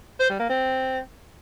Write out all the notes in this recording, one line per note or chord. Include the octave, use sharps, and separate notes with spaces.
C5
G3
A#3
C4